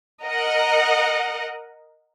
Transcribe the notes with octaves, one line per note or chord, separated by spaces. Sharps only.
A#4 D#5 F#5